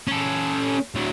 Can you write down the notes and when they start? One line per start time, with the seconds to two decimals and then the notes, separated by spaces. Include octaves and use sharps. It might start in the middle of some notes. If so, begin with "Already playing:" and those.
0.07 C#4 A4
0.95 D2 F#3